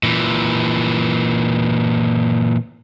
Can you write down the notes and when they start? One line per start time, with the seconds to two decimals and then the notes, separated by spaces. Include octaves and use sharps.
0.03 A#2 E3